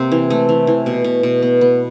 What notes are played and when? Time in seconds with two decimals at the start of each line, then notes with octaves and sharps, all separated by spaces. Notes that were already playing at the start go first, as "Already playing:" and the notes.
Already playing: C3 A#3 C4
0.12 E3
0.30 A3
0.49 E3
0.67 E3
0.86 B2
1.04 B2
1.23 B2
1.42 B3
1.61 B3